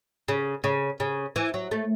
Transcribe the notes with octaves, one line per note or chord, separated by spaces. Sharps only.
C#3
C#3
C#3
E3
F#3
A3